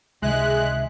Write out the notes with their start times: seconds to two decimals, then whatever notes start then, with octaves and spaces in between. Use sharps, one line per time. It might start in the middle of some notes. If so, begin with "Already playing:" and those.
0.22 C#2 C3 D#3 G#3 E5 F#6